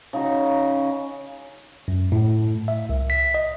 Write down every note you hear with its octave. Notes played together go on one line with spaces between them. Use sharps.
C#3 D#4 F#4
F#2
A2
E5
C2
B6
D#5